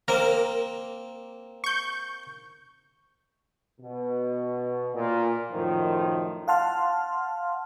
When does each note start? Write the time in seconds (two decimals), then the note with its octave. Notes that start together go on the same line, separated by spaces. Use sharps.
0.08 A#3 C4 A#4
1.64 C#6 G6
3.81 B2
4.95 A#2
5.51 F#2 A2 D#3 F3
6.48 F5 F#5 A5 C6 F6